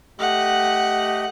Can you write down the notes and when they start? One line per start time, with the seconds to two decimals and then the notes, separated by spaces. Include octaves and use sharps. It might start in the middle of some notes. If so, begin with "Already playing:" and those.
0.19 A3 G4 D#5 F#5